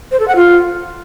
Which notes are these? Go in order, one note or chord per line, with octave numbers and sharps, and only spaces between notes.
C5
A4
F#5
F4